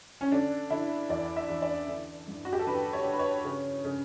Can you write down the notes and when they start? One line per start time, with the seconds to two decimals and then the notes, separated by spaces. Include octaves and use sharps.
0.21 C#4
0.32 D3 D4
0.70 D3 E4
1.09 E2 D5
1.37 E5
1.49 E2
1.62 D5
1.88 D3
2.28 G2
2.45 F#4
2.53 G4
2.59 A4
2.67 D3 B4
2.93 C#5
3.05 D3
3.13 B4
3.19 C#5
3.45 C#3
3.85 C#3